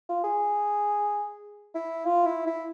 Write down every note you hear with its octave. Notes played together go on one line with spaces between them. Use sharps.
F4
G#4
E4
F4
E4
E4